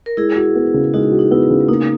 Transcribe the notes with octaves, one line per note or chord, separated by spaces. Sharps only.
A#4
G#3 E4 G#4
F#4
B3
C#3
G#3 D#4 F#4
F#4
D#4
B3 E4
C#3
A#3 D#4